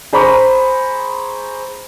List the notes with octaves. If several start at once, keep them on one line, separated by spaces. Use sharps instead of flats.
G#4 C5 A#5 B5 C#6